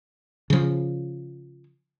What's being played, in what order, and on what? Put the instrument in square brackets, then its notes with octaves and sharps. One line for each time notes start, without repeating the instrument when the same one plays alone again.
[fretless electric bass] C#3 F3